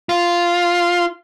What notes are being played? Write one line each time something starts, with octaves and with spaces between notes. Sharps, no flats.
F4